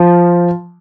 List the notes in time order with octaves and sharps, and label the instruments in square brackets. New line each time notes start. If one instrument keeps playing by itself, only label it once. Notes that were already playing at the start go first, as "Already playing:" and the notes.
Already playing: [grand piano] F3